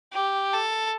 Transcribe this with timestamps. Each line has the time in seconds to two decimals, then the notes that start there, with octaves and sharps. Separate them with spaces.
0.13 G4
0.53 A4